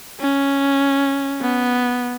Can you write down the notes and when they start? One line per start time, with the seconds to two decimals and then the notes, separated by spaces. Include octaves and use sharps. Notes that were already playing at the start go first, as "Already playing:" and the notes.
0.21 C#4
1.41 B3